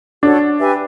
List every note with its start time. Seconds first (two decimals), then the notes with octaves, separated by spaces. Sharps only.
0.22 D4 F#4 A4 C#5
0.59 G4 B4 E5 G#5